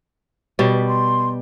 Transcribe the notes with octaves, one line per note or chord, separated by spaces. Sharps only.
B2 G3 C#5
B4
C6